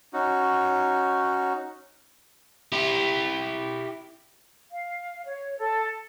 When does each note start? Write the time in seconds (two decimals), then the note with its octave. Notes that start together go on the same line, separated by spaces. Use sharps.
0.13 C#4 D#4 F#4
2.72 E4 G4
4.71 F5
5.25 C#5
5.59 A4